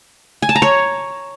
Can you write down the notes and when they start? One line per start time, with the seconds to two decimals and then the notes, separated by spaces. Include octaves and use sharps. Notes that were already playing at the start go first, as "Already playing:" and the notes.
0.42 G#5
0.49 A5
0.55 A#5
0.62 C#5